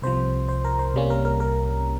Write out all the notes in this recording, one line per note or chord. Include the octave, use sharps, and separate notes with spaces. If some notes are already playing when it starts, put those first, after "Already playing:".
C2 C3 F3 C5
C5
A#4
C5
C2 C3 G3 A#3 C#4
A#4
A#4
A#4